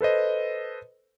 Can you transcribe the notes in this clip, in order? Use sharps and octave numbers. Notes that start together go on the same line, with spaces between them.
A4 B4 C5 D#5